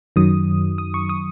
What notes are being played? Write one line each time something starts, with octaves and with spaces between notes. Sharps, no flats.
F#2 D#3 F#3 D#6
D#6
C#6
D#6